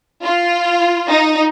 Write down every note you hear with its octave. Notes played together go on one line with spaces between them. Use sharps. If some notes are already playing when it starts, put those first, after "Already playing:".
F4
D#4